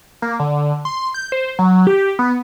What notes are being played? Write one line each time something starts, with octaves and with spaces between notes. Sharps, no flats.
A#3
D3
C6
G6
C5
F#3
G4
B3